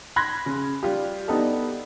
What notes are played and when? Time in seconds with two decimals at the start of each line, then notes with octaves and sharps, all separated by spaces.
0.16 B5 C6 F#6 G#6 A#6
0.46 C#3
0.83 G3 F4 G4
1.28 B3 D4 D#4 G4 A4